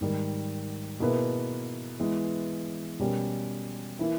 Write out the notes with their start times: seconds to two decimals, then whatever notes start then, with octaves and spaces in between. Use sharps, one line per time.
0.01 G#2 D#3 G3
1.00 B2 A#3 E4 G#4 B4
2.00 E3 G#3 B3
2.99 B2 G3 C#4 G4 A#4
3.99 E3 A#3 E4